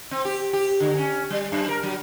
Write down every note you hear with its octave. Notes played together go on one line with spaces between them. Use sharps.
C4
G4
G4
D3
C#4
G3
F#2
A#4
F#3